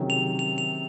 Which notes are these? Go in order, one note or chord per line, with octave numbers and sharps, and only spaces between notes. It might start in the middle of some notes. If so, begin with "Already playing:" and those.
Already playing: C3 D#3 F#3 C#4 G#4
F7
F7
F7